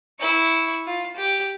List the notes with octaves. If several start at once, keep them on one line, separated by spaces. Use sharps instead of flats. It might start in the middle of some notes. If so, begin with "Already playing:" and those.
E4 C#6
F4
G4